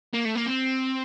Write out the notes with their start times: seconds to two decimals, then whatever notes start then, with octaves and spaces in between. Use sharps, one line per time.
0.14 A#3
0.25 A3
0.36 A#3
0.47 C4